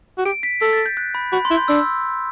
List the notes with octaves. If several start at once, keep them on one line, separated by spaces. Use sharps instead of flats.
F#4
G4 D7
B6
A4 B6
A6
G6
F#6
B5
F#4 B5
C6
E4
G6
D4 E6